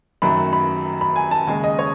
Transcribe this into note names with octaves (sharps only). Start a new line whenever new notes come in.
F#2 D#3 F#3 A3 B5
B5
B5
G#5
A5
D#2 C#3 G#3 G#5
D#5
C#5